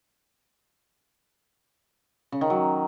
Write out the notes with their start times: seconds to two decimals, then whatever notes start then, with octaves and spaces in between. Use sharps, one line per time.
2.32 C#3
2.41 D#3
2.50 F#3